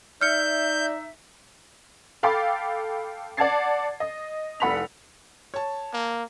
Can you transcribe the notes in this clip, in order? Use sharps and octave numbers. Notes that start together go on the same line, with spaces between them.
D#4 D5 E5 F6 G6 C#7
A4 F5 G5 B5 D6 A6
D5 F#5 A5 G#6 A6 C7
D#5
F1 C2 F#5 B5 B6 F7
C#5 A5
A#3